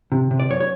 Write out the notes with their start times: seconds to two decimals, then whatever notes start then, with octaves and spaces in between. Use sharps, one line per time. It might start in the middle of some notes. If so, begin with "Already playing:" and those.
0.12 C3
0.31 C3
0.40 D5
0.50 F#2 C#5
0.60 C#5